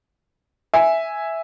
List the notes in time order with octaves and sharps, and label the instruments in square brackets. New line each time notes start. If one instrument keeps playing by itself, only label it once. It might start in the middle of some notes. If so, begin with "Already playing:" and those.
[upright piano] E5 G#5